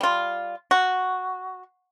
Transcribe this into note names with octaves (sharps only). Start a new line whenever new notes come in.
G3 F4
F#4